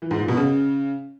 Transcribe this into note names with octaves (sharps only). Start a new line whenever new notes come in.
E3
G#2
A#2
B2
C#3